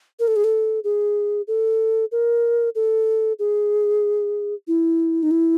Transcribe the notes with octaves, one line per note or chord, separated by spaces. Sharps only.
A#4
A4
G#4
A4
G#4
A4
A#4
A4
G#4
E4
D#4
E4